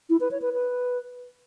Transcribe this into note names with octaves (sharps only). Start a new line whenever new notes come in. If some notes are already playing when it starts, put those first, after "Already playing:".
E4
B4
C#5
B4
B4